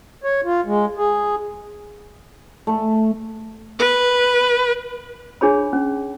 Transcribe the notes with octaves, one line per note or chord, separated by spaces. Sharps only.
C#5
F4
G#3
G#4
A3
B4
D4 G#4 C#5 B5
C#4